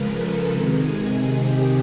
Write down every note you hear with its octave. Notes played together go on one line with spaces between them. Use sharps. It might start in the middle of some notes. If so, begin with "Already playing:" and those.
Already playing: C#3 F3 G#3 A#4 B4
A4
C3 D#3 G#3
G#4
G4